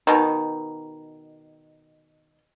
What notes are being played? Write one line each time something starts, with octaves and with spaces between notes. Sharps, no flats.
B2 D#3